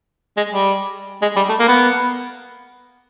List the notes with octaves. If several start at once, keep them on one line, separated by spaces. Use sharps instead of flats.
G#3
G3
G#3
G3
A3
A#3
B3